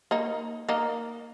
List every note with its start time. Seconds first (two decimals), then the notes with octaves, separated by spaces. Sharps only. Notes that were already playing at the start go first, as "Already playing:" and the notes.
0.11 A#3 D#4
0.69 A#3 D#4